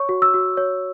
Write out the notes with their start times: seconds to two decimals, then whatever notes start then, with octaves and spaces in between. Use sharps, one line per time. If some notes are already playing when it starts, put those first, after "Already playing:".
Already playing: C#5 C#6
0.09 F#4
0.22 E6
0.34 F#4
0.57 C#5